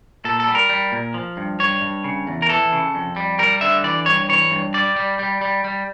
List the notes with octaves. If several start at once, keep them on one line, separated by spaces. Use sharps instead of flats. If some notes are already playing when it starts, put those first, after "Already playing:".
A#2 A4
A4
G3
A#4
G3
A#2
F3
G2
G2 C#5
G2
C#3
E2
A#4
E3 A4
C#3
F2
G3
G3 A#4
D3 E5
E3 D5
G2 C#5
E3 C#5
G2
G3 D5
G3
G3
G3
G3